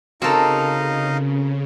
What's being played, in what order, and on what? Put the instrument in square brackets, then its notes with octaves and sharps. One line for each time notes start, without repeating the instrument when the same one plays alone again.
[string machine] C#3 [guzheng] C4 A4 [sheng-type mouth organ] D#4 D#5 F5 [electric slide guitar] F#4 A#4